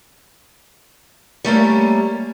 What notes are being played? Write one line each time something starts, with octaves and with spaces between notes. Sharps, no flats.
G3 A3 A#3 C#4